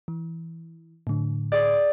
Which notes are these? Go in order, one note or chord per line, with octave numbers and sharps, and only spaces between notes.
E3
A2 D3
G#4 D5